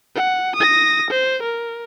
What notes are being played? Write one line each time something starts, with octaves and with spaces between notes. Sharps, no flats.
F#5
D#6 A#6
C5
A#4